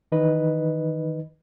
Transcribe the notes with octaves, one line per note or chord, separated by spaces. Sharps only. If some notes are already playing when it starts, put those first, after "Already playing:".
D#3 E3 D#4 B4 D#5